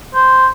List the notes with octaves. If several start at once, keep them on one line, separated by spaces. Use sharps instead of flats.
C5